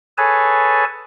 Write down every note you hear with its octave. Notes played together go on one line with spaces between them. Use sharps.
G#4 A4 B4 C#5 G#5 A5